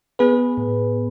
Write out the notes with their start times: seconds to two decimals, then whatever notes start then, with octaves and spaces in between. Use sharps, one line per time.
0.19 B3 G#4 B4
0.57 A2